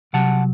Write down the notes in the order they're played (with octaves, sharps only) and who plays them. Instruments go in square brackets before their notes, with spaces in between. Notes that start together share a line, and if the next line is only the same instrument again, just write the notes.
[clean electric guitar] C2 C3 F#3 F#5 A5